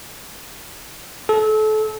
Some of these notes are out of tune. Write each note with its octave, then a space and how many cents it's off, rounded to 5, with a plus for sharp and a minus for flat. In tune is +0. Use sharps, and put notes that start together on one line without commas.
A4 -30